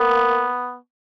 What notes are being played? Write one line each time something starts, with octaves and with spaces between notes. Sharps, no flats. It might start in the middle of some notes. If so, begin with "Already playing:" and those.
Already playing: A#3 B3